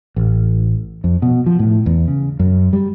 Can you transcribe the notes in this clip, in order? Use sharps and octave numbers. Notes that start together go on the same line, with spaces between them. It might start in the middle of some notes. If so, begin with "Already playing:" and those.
A1
F2
B2
F3
A2
E2
C#3
F#2
G3